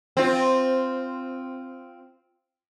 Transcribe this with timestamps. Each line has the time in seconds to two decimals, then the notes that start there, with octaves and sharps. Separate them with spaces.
0.17 C4 F4